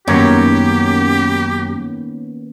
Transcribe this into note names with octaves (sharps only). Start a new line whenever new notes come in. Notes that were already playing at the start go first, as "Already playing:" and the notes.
F#2 D#3 A#3 B3 C#4 G4 A#4 C#5